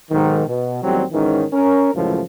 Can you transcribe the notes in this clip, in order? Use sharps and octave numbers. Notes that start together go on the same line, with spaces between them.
B1 G#2 D#3
B2
A1 D#2 F#3 G3 C4
G#2 D#3 E3 C#4
C#4 A#4
C#2 F#2 A2 E3 F3